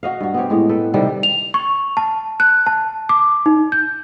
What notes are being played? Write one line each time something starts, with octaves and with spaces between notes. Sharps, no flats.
F#4 D#5 F5
G2 F#4
B3 C4 G4 C#5
A2 G#3
A4 B4 G5
C3 D#3 G3 A4
F7
C#6
A5
F#6
A5
D6
D#4
G6